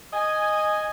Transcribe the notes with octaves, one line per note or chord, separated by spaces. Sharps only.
D#5 G#5